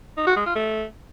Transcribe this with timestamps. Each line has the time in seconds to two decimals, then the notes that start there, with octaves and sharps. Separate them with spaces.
0.17 D#4
0.27 F#4
0.37 G#3
0.46 F4
0.56 A3